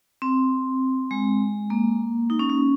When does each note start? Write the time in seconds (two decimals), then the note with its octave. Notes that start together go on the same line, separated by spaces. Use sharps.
0.22 C4
1.11 G#3
1.70 A#3
2.30 D#4
2.39 C#4
2.50 C#4